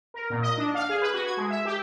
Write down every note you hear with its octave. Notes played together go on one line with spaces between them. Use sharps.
A#4
A#2
D#5
D4
F5
G#4
B4
F#4
G#6
G#3
E5
G4